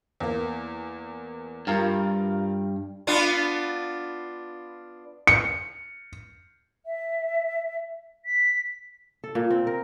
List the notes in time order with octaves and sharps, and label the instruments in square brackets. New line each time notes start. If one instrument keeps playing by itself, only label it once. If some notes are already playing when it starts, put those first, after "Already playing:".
[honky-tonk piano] E2 A#3
[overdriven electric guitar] G2 [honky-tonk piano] F4 A#4
[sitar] B3 D4 F4
[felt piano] C#7
[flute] E5
B6
[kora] A4
A#2
C4
A#4